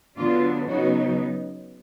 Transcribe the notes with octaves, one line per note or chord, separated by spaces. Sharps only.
D3 F#3 B3 D4 F4
C#3 F#3 B3 D#4 F#4